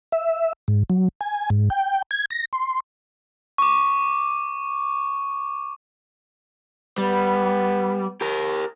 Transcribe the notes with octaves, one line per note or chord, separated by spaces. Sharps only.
E5
G#2
F#3
G#5
G#2
G5
G#6
A#6
C6
C#6 D6
G3 B3
G4 A#4